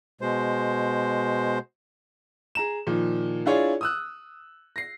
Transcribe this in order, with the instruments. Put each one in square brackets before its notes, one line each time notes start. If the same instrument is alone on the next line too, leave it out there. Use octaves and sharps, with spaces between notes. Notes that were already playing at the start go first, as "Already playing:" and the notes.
[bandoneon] B2 G#3 C5
[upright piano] G#4 A#5 E7
A#2 D#3 F3
D4 E4 F4 G#4 C#5 D5
D#6 E6 F#6
A#6 C7